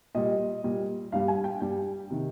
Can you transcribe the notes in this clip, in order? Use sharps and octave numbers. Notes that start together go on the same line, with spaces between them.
A#2 G3 D#5
A#2 G3
G2 G3 F5
G#5
G5
G2 G3 G5
C3 D#3